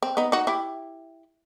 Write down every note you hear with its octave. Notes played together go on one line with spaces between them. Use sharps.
C4
B3 D#4
D#4 F#4
E4 G4